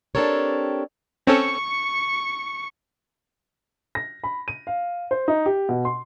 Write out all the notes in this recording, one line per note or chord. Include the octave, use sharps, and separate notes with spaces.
C4 D4 G4 A4 A#4 C#5
C4 C#4 A4 C#6 C#7
A#6
B5
D#7
F5
C5
D#4
G4
B2
C6